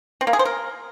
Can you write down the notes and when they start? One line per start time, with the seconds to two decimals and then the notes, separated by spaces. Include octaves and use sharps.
0.21 C4
0.27 A#3
0.33 G#4
0.39 C5
0.45 A#4